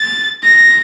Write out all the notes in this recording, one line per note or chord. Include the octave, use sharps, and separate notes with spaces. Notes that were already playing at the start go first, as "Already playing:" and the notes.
Already playing: A6
A#6